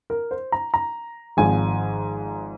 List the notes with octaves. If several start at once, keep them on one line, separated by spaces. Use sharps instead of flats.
A#4
C5
A#5
A#5
G#1 G#2 F3 G#5